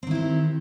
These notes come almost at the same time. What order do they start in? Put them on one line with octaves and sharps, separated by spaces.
C4 D#3 E4 G4